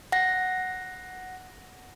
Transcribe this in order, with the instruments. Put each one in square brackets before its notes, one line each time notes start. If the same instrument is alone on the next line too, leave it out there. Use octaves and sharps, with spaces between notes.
[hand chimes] F#5 A#6